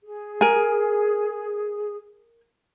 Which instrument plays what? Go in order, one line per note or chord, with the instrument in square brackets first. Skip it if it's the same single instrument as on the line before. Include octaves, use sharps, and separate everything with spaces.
[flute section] G#4
[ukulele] A#4 G#5